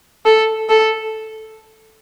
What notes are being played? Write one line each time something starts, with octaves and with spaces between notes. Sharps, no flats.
A4
A4